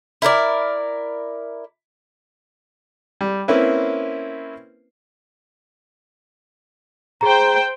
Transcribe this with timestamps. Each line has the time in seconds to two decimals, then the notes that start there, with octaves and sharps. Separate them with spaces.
0.22 E4 A#4 C5 D5
3.21 G3
3.48 A#3 C4 C#4 E4 B4
7.21 G#4 C5 G5 A#5